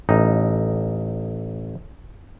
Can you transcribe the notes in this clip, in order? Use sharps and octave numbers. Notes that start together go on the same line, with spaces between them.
A1 D#4